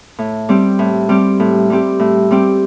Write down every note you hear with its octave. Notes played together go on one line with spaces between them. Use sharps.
A2
G3 C4 G4
A2
G3 C4 G4
A2
G3 C4 G4
A2
G3 C4 G4